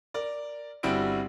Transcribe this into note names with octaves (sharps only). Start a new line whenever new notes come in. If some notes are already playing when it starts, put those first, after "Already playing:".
A#4 D5
G1 G3 C4 E4 F#4 D7